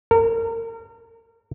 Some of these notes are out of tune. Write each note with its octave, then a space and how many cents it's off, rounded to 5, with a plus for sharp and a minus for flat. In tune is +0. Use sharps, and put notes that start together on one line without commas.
A#4 -35